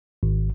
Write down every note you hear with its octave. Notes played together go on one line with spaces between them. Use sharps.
G#1